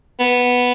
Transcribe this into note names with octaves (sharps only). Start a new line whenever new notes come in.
B3